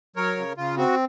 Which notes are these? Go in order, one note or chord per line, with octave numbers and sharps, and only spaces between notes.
F#3 A#4 C#5
C#3
C#3 F4
C4 F#4